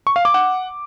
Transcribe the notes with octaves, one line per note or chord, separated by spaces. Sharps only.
C#6
F5
D6
F#5